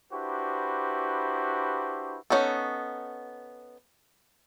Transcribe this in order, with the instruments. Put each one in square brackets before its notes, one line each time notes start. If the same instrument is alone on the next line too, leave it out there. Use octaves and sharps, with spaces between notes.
[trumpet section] D4 E4 F#4 G4 B4 C5
[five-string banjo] B3 C#4 D#4 A4